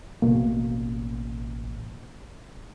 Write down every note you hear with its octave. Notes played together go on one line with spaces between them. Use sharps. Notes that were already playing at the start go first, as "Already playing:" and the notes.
A1 B2 A#3